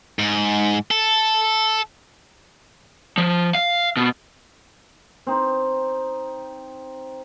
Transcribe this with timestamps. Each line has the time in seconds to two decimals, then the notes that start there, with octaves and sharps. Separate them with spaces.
0.19 G#2
0.91 A4
3.18 F3
3.55 F5
3.97 B2
5.27 C4 D#4